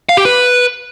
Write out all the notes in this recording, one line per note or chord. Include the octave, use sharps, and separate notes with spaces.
F5
G4
B4